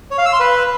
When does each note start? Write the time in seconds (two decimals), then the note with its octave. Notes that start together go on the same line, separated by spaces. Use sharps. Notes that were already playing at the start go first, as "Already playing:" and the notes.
0.11 C#5
0.18 F5
0.25 E6
0.33 C6
0.40 B4